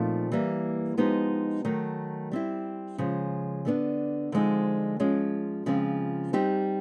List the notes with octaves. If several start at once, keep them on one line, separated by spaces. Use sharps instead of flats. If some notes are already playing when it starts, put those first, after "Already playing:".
Already playing: A#2 F3 A3 C4 D#4
E3 G3 A#3
F3 G#3 B3 D#4 G4
D#3 F#3 A3
G3 C4 E4
C#3 F3 G#3
D3 G3 B3 D4
D3 F3 G#3 C4 D#4
F3 G#3 C#4
C#3 F3 G#3 C4
G3 C4 D#4 G4